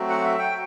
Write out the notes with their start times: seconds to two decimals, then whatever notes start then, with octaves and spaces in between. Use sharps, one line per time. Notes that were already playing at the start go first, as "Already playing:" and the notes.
Already playing: F#3 A3 C4 F#4
0.09 F#5
0.24 E5
0.39 G5